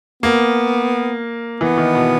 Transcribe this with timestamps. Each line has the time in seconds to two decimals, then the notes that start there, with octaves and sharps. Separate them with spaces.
0.23 A#3 B3
1.60 E3 B3
1.78 D#3
1.95 B2